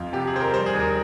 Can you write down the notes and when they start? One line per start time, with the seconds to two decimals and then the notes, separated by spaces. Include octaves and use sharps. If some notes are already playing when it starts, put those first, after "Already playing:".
Already playing: F2 F3 F4
0.13 C3 G4
0.27 G#4
0.33 F2 C5
0.41 A#4
0.53 G3 C5
0.66 G#4
0.73 D#2
0.80 A#4